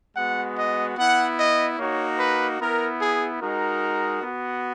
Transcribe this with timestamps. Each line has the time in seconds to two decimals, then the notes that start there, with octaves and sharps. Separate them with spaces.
0.16 G#3 B3 F#4 F#5
0.57 D#5
0.98 B3 E4 F#5
1.39 D#5
1.78 A#3 D#4 F#4 C#5
2.19 B4
2.60 B3 E4 A#4
3.00 G#4
3.41 G#3 D#4 F#4 A#4
4.22 B3 F#4